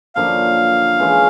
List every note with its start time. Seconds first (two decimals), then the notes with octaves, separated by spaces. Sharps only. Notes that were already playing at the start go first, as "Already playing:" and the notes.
0.15 F#2 D3 F3 A#3 F5
1.00 E3 G#3 C#4 F4